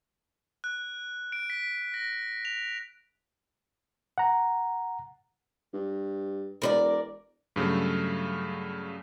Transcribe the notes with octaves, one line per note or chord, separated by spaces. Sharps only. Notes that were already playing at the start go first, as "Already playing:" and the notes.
F#6
D7
B6
A#6
F7
F#5 A#5
G2
E1 A#4 B4 D5
G2 C#3 F#3 A3